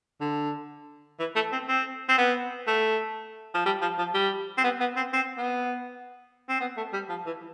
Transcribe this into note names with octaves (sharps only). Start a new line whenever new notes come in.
D3
E3
A3
C4
C4
C4
B3
A3
F3
G3
F3
F3
G3
C4
B3
B3
C4
C4
B3
C4
B3
A3
G3
F3
E3